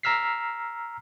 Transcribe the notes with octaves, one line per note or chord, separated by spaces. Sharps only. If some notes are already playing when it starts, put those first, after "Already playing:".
A#5 E6 F6 B6 C7